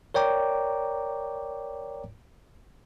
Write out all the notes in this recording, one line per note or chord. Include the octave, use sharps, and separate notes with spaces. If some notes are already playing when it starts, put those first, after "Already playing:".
A#4 C#5 D5 G5 A#5 D6